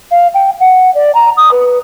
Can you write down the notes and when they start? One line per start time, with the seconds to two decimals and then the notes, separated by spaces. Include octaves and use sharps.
0.11 F5
0.34 G5
0.60 F#5
0.95 D5
1.15 A#5
1.37 D#6
1.51 B4